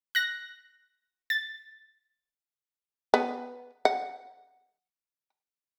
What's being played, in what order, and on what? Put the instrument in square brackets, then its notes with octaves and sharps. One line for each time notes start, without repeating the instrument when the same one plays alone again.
[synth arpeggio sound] F#6 A#6
A6
[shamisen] B3
F#5